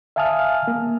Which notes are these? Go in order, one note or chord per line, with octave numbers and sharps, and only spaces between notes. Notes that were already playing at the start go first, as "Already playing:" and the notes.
E5 F5 G#5 A5 D#6 F6
A#3